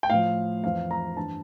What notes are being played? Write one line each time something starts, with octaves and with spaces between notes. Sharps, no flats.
G5
A2 F3 F5
F2 E3 F5
A#5
G2 E3 A5